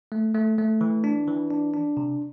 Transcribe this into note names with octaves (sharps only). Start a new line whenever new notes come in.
A3
A3
A3
E3
D4
E3
D4
D4
C3